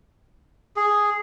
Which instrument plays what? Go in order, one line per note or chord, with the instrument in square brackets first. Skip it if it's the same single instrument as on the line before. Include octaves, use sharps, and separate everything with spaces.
[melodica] G#4